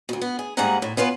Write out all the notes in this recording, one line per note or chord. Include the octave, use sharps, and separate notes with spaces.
D2 B2
B3
G#4
G#2 G3 A#3 G#4 F#5 A#5
A2
B3 C#4 F4 B4